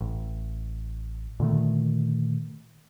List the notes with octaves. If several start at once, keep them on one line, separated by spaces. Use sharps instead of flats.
A1
A#2 D3 D#3 A3